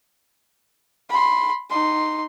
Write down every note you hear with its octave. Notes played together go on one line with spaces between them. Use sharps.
B5 C6
D#4 C6